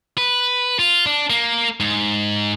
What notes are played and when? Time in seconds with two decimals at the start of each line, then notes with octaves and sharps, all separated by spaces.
0.18 B4
0.79 F4
1.06 D4
1.30 A#3
1.80 G#2